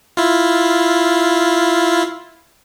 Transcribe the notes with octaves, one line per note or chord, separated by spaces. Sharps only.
E4 F4